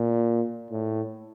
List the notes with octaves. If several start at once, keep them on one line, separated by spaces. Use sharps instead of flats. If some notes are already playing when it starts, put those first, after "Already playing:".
Already playing: A#2
A2